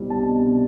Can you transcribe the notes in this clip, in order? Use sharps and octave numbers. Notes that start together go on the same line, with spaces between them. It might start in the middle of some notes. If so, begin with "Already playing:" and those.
Already playing: C2 B2 G3 C4
D4 A5
B2
D4